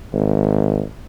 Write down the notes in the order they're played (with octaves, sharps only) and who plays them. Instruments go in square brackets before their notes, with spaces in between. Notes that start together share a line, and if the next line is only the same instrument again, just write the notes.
[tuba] G#1